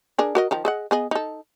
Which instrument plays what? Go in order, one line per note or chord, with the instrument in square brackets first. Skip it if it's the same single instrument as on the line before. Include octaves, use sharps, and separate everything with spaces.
[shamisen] D4 G#4 A#4
F#4 A#4 D#5
D#3 F3 A#5
G#4 D#5 F#5
B3 G#4 D#5
D#4 A4